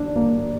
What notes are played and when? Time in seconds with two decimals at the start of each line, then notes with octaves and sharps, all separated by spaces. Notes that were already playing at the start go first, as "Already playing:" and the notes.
Already playing: D4
0.16 A#3